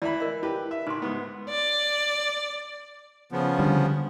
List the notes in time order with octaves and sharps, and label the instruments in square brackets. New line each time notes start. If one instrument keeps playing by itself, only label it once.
[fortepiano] E3 E5 B5 [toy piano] D5
[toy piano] A#4 D#5
[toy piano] E4 [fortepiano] G4 B4
[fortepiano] E5
[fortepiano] A1 [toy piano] D#4 C6
[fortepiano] G#2 B3
[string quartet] D5
[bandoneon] C#3 F3 B3
[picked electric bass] D3 G3